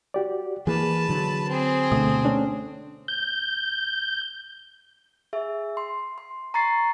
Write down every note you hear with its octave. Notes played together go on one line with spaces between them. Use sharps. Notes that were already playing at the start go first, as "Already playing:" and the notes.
F#4 G4 D5
E3 A#3 G#4 B4 A5
D3 F#3
C4 G#4
D2 B2 D3 A3 D#6
A3 C#4 D4
G6
G#4 E5
C6
C6
A#5 C#6 A6 C7